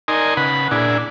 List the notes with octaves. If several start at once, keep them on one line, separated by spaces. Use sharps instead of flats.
D#4 A#4 D5 D#5 G#5 C6
C#3 B4 F#5 B5
A#2 D4 E4 G#4 D5